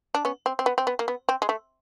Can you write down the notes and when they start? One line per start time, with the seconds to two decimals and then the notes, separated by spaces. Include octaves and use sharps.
0.15 D4
0.25 B3 C#4
0.46 C4
0.59 C4
0.66 B3
0.78 C4
0.87 B3
0.99 A#3
1.08 B3
1.29 C4
1.42 G#3
1.49 A3